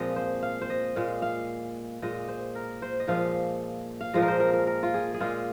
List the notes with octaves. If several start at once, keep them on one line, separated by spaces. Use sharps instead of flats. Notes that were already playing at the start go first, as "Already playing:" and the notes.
Already playing: A#2 F3 G#3 C4 D#5
C5
F5
C5
D#5
A#2 G#3 F5
F5
A#2 G#3 D#5
C5
A#4
C5
D#5
A#2 F3 G#3 F5
F5
A#2 F3 G#3 D#5
A#4
C5
A#4
A#4
A#4
F4
G#4
G#4
A#2 G#3 F4